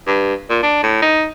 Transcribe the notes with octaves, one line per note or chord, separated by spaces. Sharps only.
G2
A#2
D4
A2
D#4